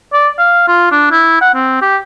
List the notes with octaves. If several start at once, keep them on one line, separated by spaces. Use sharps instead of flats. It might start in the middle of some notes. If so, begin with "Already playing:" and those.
D5
F5
F4
D4
E4
F#5
C4
G4